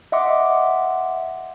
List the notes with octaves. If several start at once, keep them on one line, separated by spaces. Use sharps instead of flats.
D#5 E5 F#5 C6 D6